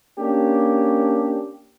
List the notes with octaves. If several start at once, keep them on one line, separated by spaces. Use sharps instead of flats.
A#3 C#4 D4 G4